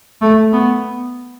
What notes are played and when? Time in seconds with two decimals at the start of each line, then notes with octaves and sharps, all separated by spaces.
0.22 A3
0.53 B3